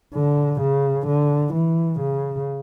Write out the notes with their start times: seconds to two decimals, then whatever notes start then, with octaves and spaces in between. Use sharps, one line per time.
0.14 D3
0.61 C#3
1.07 D3
1.54 E3
2.00 C#3